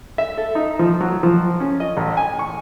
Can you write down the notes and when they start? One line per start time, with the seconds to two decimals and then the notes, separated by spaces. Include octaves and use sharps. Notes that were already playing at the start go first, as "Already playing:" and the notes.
0.18 E5
0.38 A4
0.55 D#4
0.79 F3
1.01 F#3
1.23 F3
1.60 C#4
1.80 D#5
1.97 A1
2.17 G#5
2.39 C#6